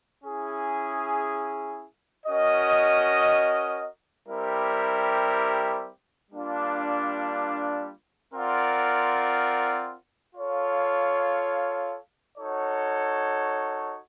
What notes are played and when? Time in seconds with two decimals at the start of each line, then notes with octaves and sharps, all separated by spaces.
0.24 C#4 E4 G#4
2.26 C#4 F#4 A#4 D#5
4.29 G3 C4 E4 G4 A#4
6.31 G3 A#3 D4 F4
8.33 C4 F4 A#4 D5 F#5
10.35 F4 A4 C#5 F5
12.38 D#4 F#4 A4 C#5